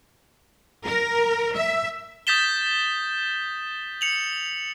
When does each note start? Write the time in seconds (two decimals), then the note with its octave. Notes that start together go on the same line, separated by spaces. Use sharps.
0.86 A#4
1.55 E5
2.27 D#6 G6 A6 B6 E7 G7
4.01 C#7 F7 F#7